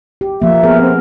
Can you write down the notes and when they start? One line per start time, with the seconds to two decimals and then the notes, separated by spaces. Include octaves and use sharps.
0.21 G4
0.42 F3 A#3 E5
0.63 B3 G#4 A#4
0.81 C4